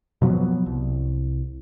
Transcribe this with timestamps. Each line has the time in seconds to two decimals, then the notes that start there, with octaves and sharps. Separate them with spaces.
0.22 B2 F3 F#3 B3
0.66 C2